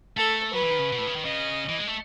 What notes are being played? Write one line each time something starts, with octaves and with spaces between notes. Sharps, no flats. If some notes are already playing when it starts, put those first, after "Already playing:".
A3 A4
F#3 B4
E3
D#3
C#3
B2
A2
C#3
D#3
C#3 D#5
E3
G#3
A3